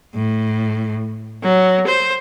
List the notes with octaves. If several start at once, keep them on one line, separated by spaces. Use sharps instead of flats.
A2
F#3
C5